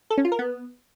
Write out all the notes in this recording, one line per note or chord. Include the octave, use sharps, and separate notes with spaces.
A4
C#4
F4
A#4
B3